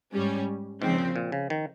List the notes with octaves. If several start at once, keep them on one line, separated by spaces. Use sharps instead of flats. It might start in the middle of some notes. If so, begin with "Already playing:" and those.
G#2 G3 C#4
G#2 C#3 F3 C4
A#2
A#2
C#3
D#3